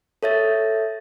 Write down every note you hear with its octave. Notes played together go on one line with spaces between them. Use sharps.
A4 C#5 E5 A6